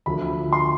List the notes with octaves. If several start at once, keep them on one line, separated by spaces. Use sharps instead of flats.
D2 D3 F3 B5
C6